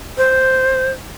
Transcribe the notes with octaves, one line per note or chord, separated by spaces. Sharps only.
C5